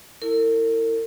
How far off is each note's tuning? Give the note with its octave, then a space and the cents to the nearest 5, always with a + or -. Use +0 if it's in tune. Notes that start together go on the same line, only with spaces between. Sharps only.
E4 +0 A#4 -45